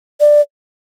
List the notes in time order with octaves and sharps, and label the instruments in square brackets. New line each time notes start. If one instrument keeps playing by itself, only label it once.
[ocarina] D5